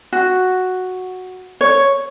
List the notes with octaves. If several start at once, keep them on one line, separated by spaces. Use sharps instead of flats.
F#4
C#5